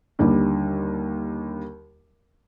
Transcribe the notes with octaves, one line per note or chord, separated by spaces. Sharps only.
D#2 D3 G3